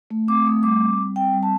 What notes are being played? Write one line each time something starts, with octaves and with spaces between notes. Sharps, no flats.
A3
C4 D6
A3 D#6
G3 D6
C4
G3
C4 G5
G3
A5